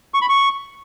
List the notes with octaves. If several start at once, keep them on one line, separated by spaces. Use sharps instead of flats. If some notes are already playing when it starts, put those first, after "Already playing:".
C#6
B5
C#6